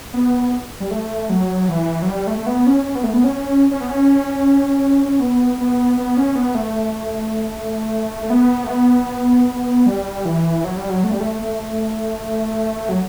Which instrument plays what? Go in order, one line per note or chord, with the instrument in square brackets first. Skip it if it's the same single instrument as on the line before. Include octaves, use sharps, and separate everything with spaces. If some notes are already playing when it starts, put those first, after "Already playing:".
[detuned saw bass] B3
G3
A3
F#3
E3
F#3
G3
A3
A3
B3
C#4
C#4
B3
A3
B3
C#4
C#4
B3
C#4
C#4
B3
B3
B3
C#4
B3
A3
A3
B3
A3
B3
G3
E3
F#3
G3
F#3
A3
G3
A3
A3
F#3